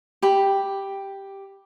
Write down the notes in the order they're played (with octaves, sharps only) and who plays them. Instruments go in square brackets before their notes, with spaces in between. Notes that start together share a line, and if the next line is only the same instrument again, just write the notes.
[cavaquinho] G4 B5